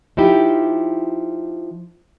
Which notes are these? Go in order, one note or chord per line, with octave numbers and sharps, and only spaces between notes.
F3 D#4 E4 G4